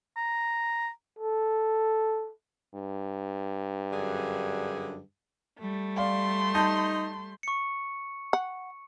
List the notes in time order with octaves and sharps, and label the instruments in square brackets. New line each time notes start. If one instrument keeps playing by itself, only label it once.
[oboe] A#5
[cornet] A4
[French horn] G2
[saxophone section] F#2 D3 G#4
[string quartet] G3 A3
[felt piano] D5 F5 [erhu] C6
[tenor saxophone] D#4 [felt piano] A5 G6
[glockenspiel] C#6 C#7
[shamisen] F#5